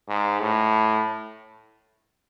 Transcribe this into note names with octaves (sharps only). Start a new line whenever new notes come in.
G#2
A2